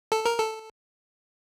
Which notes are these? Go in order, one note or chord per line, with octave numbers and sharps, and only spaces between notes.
A4
A#4
A4